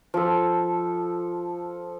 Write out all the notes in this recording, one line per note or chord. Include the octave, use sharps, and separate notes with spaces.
F3 A4